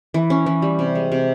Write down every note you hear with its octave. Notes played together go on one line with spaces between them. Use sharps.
E3
C#4
E3
G3
C3
G#3
C3